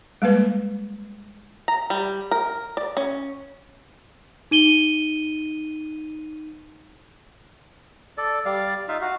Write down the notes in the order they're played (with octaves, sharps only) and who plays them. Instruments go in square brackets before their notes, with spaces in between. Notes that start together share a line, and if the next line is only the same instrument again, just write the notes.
[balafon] G3 G#3 A#3 B4
[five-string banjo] A#5
G3
A#4
D5
C#4
[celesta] D#4 D#7 G7
[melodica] A4 D5
G3 D5 F5
D#4 F4 E5 F5
F#4 F5